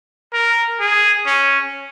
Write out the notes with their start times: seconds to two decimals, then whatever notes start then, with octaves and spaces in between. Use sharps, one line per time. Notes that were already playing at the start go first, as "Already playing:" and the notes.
0.33 A#4
0.80 G#4
1.26 C#4